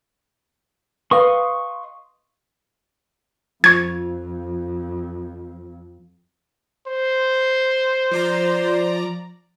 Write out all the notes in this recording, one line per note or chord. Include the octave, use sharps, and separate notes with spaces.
B4 D#5 F5 C6 C#6 D#6
F2 F3 C#6 G#6
C5
F3 D5 A#5